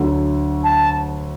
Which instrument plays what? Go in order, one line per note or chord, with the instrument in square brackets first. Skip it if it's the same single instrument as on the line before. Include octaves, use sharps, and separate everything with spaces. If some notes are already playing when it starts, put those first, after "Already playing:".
Already playing: [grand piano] D2 D3 F#3
[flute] A5